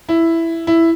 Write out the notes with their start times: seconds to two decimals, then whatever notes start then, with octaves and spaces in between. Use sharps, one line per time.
0.09 E4
0.67 E4